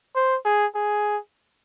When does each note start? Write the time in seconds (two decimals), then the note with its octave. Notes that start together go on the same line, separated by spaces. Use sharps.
0.16 C5
0.45 G#4
0.75 G#4